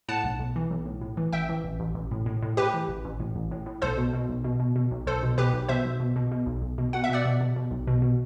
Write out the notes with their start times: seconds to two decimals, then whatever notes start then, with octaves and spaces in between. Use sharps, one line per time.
0.08 A2 F#5 A5
0.24 B1
0.39 B1
0.56 E3
0.71 B1
0.86 A2
1.01 A2
1.17 E3
1.33 A1 E5 G5
1.49 E3
1.64 A1
1.80 A1
1.95 A1
2.11 A2
2.26 A2
2.43 A2
2.57 A2 G4 B4
2.74 E3
2.88 A1
3.05 A1
3.20 A2
3.35 A1
3.51 A2
3.66 A2
3.82 B1 A4 C5
3.97 B2
4.13 B2
4.29 B1
4.44 B2
4.60 B2
4.76 B2
4.91 B1
5.07 B1 A4 C5
5.23 B2
5.38 B2 G4 B4
5.53 B1
5.68 B2 C5 E5
5.85 B1
6.00 B2
6.16 B2
6.32 B2
6.46 B1
6.62 B1
6.78 B2
6.93 B2 F#5
7.04 E5
7.09 B2 D5 F#5
7.25 B2
7.41 B2
7.56 B2
7.71 B1
7.87 B2
8.02 B2